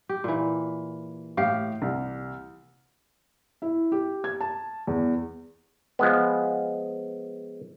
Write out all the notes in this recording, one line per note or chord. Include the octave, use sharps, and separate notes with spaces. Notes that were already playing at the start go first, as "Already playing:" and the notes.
G4
A#2 E3
A2 G4 F5 C7
C2
E4
G4
G#6
A5
E2
F3 G#3 B3